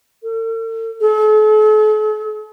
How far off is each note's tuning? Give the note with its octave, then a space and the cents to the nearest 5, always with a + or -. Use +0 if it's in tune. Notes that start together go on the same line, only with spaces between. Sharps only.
A4 +45
A4 -45